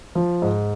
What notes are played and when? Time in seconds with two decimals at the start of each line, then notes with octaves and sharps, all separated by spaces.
0.15 F3
0.42 G#2